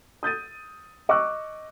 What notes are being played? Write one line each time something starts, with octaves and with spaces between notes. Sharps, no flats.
D#6 G6 A6 D#7
D#5 C#6 D6 E6 F#6